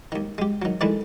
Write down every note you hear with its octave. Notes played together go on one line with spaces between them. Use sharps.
D#2 D#3
G#3 G4
D#3 F#3
D#3 E3 G#3 A3 D4 E4